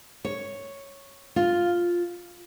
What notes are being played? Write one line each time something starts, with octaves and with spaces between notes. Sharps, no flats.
C#5
F4